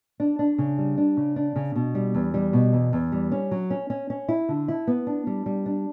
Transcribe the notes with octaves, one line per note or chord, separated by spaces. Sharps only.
D4
D4
C#3
G3
D4
C#3
D4
C#3
B2
G3
E2
G3
B2
E2
E2
G3
C#4
F#3
C#4
C#4
C#4
E4
D3
E4
B3
D4
G3
G3
D4